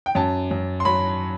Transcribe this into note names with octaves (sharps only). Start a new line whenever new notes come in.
G5
F#2 A5
F#2
C6
F#3 B5